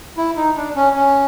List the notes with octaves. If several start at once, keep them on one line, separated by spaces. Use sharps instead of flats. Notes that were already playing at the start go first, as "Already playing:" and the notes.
E4
D#4
D4
C#4
C#4